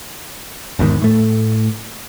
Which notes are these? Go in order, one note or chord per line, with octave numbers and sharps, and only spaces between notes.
G#1 E2 G#2 D#3
A2 A3